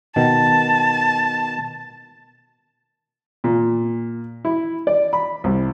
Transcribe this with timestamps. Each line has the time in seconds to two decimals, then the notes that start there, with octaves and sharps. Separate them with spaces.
0.16 B2 D#3 A5
3.44 A#2
4.45 E4
4.87 D5
5.13 B5
5.44 C2